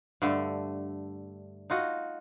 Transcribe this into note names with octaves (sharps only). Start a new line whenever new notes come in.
G2 D3 A3
D#4 F4 F#4 D#5